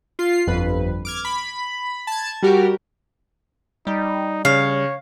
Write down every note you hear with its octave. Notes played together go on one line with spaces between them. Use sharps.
F4 C7
G1 F2 B4
D6 F6 G#6
B5
A5 G#6
G3 F#4 G4 A#4
G3 D#4
C#3 C#5 F5